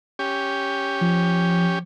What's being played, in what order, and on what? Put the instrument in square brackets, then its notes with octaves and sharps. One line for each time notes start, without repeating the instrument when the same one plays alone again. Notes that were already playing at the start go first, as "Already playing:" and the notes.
[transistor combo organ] C#4 G4
[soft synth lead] F3